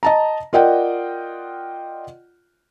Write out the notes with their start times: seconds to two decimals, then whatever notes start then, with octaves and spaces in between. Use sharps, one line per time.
0.03 D#5 A5 A#5
0.53 F4 A#4 D5 D#5 F#5 G5